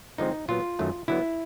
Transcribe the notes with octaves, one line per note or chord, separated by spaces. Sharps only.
D3 F3 G#3 C4 D#4
A#2 F#3 B3 F4
F#2 D#3 F#3 A3
D3 F#3 B3 E4